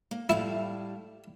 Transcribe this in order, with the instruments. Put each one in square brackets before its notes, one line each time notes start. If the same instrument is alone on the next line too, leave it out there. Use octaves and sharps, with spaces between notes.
[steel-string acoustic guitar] A#3
[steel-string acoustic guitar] A2 G3 F5 [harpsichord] E4